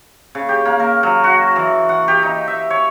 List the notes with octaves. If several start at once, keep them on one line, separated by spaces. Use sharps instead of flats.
C#3
G4
A#3
A#4
F#3
F#4
E3
F#5
G4
D#4
E5
C#5